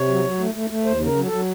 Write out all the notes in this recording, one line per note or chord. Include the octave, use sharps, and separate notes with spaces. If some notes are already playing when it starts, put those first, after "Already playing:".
Already playing: C3 C#5
F#3
F#3
A3
A3
A3
D#2 C5
C#3 A#4
F#3
A4
F#3